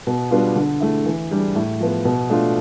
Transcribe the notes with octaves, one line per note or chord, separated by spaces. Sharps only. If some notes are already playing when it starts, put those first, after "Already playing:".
B2
G3 B3 D4 F4
D3
A3 E4
E3
G3 D4
A2
F3 B3
B2
A3 D4 F4